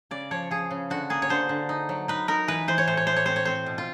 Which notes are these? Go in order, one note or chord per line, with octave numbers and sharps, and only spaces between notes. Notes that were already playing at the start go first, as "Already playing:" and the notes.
C#3 D5
F3 C#5
F3 G#4
C#3
D3 F#4
A#3 G#4
C#5
D3 C5
D3
D#4
F#3
D#4 B4
D#4 A#4
E3 B4
E3 C5
C#5
A2 C5
C#5
A2 C5
C#5
C4 C5
C#5
C4 C5
B2
F4